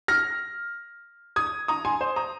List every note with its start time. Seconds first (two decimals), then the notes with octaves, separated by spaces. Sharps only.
0.08 F6 A#6
1.36 D#6 G#6
1.68 A#5 D#6
1.85 G#5 C6
2.01 C5
2.16 A#5 D#6